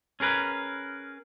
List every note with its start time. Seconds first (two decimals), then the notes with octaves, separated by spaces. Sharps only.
0.20 C#4 G#4 A#4 B4